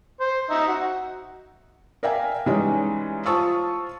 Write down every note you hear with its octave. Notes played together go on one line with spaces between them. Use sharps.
C5
D#4 E5
F#4
A#4 D5 E5 F5 G5 G#5
E3 G3 G#3 C#4 D#4
F4 C5 A5 C#6 D#6 E6